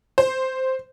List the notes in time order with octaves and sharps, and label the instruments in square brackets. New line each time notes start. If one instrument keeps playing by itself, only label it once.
[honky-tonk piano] C5